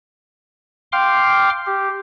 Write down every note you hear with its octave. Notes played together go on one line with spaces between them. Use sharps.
F5 G5 C6 D6 F6
G4